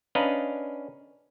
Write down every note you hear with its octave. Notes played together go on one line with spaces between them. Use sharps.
C#4 D4 B4 D#5 F5 A#5